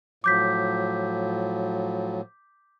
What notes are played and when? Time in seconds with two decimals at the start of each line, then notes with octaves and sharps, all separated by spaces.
0.24 A2 F3 F#3 D6 G6 B6